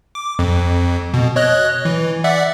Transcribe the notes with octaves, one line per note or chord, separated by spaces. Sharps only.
D6
F2
B2
C#5 D#5 F#6
E3
D5 E5 F#5